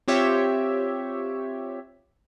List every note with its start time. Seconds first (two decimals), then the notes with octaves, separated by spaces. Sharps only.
0.08 C4 F4 G4 C#5 E5